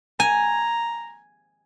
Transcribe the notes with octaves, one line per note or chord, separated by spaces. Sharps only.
G#5 A#5